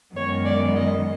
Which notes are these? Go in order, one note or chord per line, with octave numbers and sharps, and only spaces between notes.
F#2 D#3 G#3 B3 C#5
D5
D#5